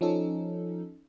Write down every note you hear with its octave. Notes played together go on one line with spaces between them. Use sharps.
F3 C#4 D#4 A4